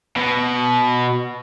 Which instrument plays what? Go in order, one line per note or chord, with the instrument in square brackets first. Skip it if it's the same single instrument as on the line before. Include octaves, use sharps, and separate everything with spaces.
[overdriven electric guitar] B2